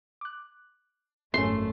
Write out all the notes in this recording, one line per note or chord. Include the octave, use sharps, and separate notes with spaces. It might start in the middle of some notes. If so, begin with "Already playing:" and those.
D6 F#6
G#1 F#2 G#3 A3 C#4 C6